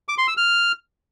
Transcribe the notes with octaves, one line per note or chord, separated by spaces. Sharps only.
D6
C6
E6
F6